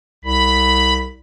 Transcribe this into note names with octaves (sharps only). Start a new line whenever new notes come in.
C2 B5